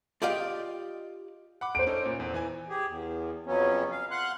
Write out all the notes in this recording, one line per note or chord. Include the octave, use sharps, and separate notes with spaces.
F4 G4 D5 D#5 F5 G5
F#5 B5 D6
C5 D7
C#4 D#4 A4
A#2
E2
E3 G#5
G4 G#4
E2
F2 C#3 F#3 B3 C#4
F5
F5 F#5 C6 F#6